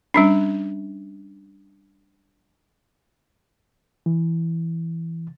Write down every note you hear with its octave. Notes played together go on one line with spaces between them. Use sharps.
G3 C#4 D4
E3